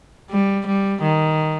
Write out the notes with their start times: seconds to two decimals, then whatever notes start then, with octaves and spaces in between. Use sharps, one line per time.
0.30 G3
0.66 G3
1.02 D#3